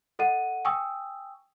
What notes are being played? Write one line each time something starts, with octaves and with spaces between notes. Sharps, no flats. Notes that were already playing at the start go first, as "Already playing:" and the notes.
A4 D#5 F#5 D#7
G5 G#5 C#6 D#6 E6